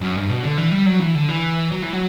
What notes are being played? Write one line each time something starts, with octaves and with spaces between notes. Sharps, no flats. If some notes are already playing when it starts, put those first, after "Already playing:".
F#2
G2
B2
D3
E3
G3
F#3
E3
D3
E3
F#3
E3
F#3